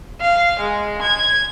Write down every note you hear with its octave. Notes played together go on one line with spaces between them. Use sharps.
F5
G#3
G#6